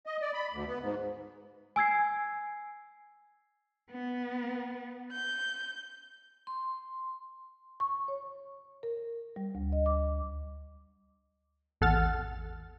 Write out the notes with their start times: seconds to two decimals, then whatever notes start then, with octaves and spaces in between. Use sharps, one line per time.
0.06 D#5
0.22 D5
0.34 B5
0.53 D2
0.68 B3
0.82 G#2
1.76 G#5 E6 G#6 C7
3.91 B3
5.11 G6
6.47 C6
7.80 C#6
8.08 C#5
8.83 A#4
9.36 G3
9.55 D2
9.72 D#5
9.86 D6
11.81 A1 E2 A4 F#5 F6 A6